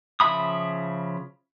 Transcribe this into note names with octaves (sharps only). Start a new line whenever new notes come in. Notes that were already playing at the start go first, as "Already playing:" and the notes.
C#3 F3 E5 B5 D#6